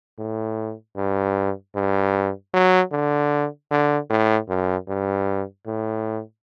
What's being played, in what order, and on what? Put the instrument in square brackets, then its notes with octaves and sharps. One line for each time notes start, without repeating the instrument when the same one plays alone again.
[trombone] A2
G2
G2
F#3
D3
D3
A2
F#2
G2
A2